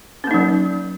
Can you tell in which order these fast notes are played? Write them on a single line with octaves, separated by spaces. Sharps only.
C#4 A#3 D#4 F#3